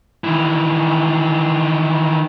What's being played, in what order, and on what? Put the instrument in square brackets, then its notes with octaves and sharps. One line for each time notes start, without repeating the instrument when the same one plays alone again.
[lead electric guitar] D#3 E3